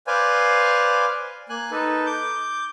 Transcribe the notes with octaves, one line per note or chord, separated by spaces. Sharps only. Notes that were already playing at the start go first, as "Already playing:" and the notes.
B4 C5 D5 F5 G#5
A#3 G#5 F#6
D#4 A4 B4
D6 G6